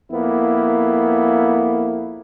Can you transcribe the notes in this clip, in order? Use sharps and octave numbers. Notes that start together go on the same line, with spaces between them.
F2 A#3 B3 E4